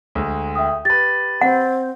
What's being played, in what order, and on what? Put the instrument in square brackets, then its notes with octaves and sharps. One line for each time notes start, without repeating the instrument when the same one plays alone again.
[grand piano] D2 G#3
[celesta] E5 G5 D#6
[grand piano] G4 B4 [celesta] A6
[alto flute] C4 [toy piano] F#5